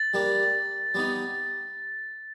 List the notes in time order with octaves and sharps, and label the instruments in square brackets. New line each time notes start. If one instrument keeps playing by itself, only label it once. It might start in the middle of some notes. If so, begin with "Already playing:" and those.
Already playing: [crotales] A6
[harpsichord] G3 A#3 D4
G3 B3 D#4